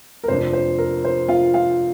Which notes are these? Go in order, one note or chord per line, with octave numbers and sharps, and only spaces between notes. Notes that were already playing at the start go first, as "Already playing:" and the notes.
A#4
F1 F2 F3 D4 C5
C5
A#4
C5
F4 F5
F4 F5